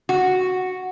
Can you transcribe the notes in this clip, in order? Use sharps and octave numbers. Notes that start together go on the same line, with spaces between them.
F#4